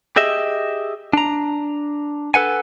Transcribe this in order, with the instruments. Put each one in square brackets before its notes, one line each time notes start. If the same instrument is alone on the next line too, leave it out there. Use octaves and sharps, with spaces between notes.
[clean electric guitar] G4 G#4 D#5 E5
D4 A#5
A4 B4 F#5 G#5